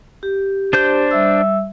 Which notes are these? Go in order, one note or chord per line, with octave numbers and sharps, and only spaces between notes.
G4
D4 C5 G6
G3 E5 E6